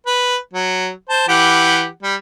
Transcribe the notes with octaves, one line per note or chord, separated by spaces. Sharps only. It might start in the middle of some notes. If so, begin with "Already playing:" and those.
B4
F#3
C5 A5
E3 G4 F#5
G3